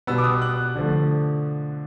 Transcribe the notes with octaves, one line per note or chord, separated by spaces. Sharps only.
B2 G3 B3 E6
D6
D#6
F#6
D3 F3 A3